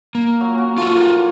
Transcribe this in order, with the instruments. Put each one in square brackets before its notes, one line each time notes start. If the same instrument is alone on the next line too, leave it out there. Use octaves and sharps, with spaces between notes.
[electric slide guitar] A#3
[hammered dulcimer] F#3
C#4 F#4
[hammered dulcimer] F3 A3 F#5 [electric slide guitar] F4 F#4
[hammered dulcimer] A#3